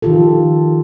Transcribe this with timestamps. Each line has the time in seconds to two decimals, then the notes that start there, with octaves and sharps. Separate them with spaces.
0.02 D#3 F3 F4 G4 A4